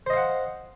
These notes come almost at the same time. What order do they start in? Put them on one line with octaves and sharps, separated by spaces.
C5 D#5 F5 F#5